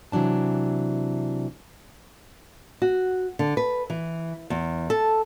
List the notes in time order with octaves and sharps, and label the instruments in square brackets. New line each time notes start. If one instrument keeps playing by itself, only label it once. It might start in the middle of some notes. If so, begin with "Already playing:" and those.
[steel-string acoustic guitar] C3 E3 F#3 D4 A5
[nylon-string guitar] F#4
D3
B4
E3
E2
A4